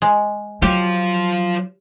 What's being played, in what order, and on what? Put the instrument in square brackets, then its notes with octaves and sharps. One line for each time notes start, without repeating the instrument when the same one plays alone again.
[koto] G#3
[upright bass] F#3 [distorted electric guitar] F4 C5 [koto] G4